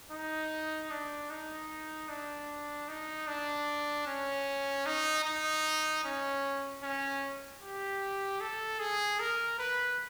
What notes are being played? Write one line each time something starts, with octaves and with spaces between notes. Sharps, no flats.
D#4
D4
D#4
D4
D#4
D4
C#4
D#4
D#4
C#4
C#4
G4
A4
G#4
A#4
B4